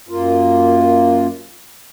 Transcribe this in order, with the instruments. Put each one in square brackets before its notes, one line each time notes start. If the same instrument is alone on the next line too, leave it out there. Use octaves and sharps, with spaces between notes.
[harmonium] F#2 A#3 F4